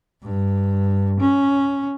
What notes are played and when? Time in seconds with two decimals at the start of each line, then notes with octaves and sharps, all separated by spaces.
0.23 G2
1.20 C#4